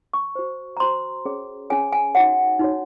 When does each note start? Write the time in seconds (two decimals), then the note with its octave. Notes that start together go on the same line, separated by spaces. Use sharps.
0.13 C#6
0.35 F#4 C5
0.77 A#5
0.80 F#4 C5 C6
1.25 C#4 G#4 C#5
1.70 C#4 G#4 C#5 G#5
1.93 G#5
2.15 D#4 F#4 C#5 F#5
2.59 D#4 F#4 C#5